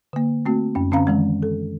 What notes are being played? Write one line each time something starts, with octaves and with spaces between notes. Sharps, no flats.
D3 A#3
A3 C4 F#4
F#2 C#4
D3 C4 C#4 F5 A#5
D#3 E3 G#3
A4